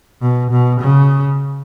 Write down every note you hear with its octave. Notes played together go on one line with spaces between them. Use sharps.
B2
B2
C#3